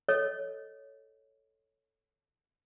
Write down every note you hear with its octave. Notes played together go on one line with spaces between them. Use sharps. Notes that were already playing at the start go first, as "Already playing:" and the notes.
A4 C#5 D#5